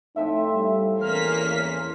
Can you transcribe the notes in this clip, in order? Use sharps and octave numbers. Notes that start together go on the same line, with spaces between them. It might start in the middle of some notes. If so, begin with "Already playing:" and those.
A2 F3 C4 D#4 E5
G3
E2 A#3 C#4 F6 B6